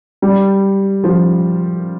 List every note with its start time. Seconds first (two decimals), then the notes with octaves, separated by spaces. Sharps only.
0.22 G3
1.04 F3